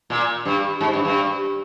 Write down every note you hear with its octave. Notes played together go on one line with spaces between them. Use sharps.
A#2
G2
G#2
G2
G2